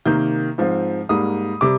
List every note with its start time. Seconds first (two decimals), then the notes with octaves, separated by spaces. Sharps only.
0.06 C3 D#3 A#3 G6
0.58 G#2 F3 C4
1.09 G#2 G3 A#3 D#6
1.61 C3 G3 D6